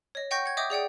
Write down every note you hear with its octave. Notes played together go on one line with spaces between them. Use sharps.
C#5 D#5
D#5 F#5 G5 C#6 G6 A#6
F#5 G#6
D#5 E5 G5 D6 D#6 G6
G#4 D5 F#5 G5